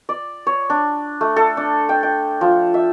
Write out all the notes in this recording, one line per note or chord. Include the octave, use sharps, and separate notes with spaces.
D5
C#5
D4
A3
A4
D4
G5
G5
F3
E5